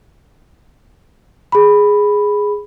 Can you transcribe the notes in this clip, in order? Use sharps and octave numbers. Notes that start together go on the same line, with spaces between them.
G#4 B5